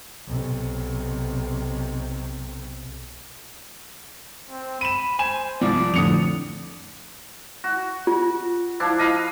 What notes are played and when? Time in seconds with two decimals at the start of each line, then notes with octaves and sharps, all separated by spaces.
0.28 B1 C3
4.49 C4
4.81 B5 D#7 E7
5.19 C5 G#5 E7
5.61 C2 F3 D5
5.94 F2 A2 D3 D#6 C#7 F7
7.64 F#4
8.07 F4
8.80 F3 D4 E4
8.99 D#5 F5 B5